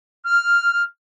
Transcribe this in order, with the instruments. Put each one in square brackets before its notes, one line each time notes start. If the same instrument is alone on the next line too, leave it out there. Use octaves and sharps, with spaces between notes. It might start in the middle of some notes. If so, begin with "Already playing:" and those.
[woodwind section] F6